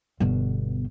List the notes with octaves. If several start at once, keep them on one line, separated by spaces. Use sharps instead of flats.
G1 B2